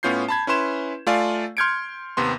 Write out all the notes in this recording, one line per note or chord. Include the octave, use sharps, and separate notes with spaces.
A2 B3 C#4 F4 G6 C7
A5 B5 G#6
C#4 E4 B4 C6 E7
A3 F4 D5 F5 G#5
C6 F6 G6 G#6 C#7 D7
D#2 C3 B3 C6